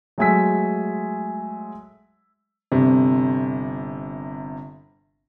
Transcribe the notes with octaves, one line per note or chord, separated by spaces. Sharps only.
F#3 G#3 A3 G#5 E6 B6
G1 C3